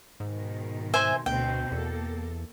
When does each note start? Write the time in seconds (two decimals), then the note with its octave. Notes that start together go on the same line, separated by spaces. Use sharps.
0.20 G#2 B2 D#3
0.94 C5 E5 G#5
1.26 D2 B2 A3 C4 G5
1.72 E2 A#3 A4